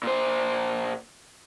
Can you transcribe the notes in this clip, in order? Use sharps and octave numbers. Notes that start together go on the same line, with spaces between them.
A#2 C5